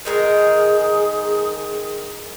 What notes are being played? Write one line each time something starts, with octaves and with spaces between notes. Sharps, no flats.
D#3 G#3 G#4 A#4